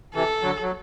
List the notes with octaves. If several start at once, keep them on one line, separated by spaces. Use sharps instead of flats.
C3 E3 A4
D3 F#3
F#3